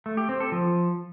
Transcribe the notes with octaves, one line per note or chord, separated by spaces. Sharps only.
A3
G4
C4
A4
F3